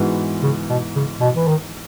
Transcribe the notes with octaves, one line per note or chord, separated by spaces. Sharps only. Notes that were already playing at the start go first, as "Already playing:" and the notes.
Already playing: G#2 E3 B3 F#4
C#3
B2
C#3
B2
E3
D#3